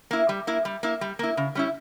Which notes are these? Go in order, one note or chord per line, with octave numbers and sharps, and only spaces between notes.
A#3 E4
G3
A#3 E4
G3
A#3 E4
G3
A#3 E4
C#3
G3 C#4 E4